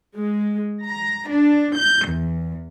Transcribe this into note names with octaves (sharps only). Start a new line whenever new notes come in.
G#3
A#5
D4
G6
E2